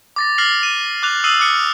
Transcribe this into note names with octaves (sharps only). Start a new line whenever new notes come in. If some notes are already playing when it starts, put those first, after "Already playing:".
D6 A6 A#6
F6 A#6 C7 F#7
D#7
D6 F#6 F7
D#6 E6 C7 D#7 F#7
D6 D#6 F6 C#7